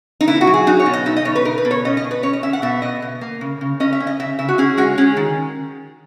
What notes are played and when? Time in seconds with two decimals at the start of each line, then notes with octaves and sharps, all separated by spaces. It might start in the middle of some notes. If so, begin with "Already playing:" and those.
0.21 D#4
0.27 B2 E4
0.41 F#4
0.47 F#3
0.54 G#4
0.67 D#4 F#4
0.80 C#5
0.86 B2
0.93 D#5
1.06 D#4 E5
1.16 D#5
1.25 B2 C#5
1.35 B4
1.45 D#4 A#4
1.58 B4
1.65 B2
1.71 C#5
1.85 C#4 D#5
1.97 D#5
2.04 B2
2.11 B4
2.23 C#4 C#5
2.33 D#5
2.43 C#4 E5
2.53 F#5
2.62 B2 E5
2.82 B2 D#5
3.02 B2
3.21 A#3
3.41 C#3
3.61 C#3
3.80 C#4 D#5
3.93 E5
4.00 C#4
4.07 D#5
4.20 C#3 E5
4.39 C#3 E5
4.49 F#4
4.58 C#4 G#4
4.77 G#3 F#4
4.98 C#4 G#4
5.17 D#3